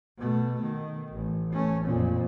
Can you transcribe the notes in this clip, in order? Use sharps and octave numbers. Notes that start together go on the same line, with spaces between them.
B2 A3
D#3
A1
A3 C#4
F2 A#2